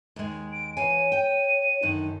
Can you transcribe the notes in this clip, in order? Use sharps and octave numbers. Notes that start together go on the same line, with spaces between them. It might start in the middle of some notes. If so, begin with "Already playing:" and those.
D#2 G#3
D7
E3 C#5 F5 G#5 D#7
G5
F#2 D3 D#3 D#4